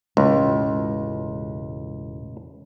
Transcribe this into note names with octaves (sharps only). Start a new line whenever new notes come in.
E1 C#2 A2